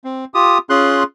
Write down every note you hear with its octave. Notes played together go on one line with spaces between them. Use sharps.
C4
F4 G4 D#6
C#4 F4 G#4 C6 F#6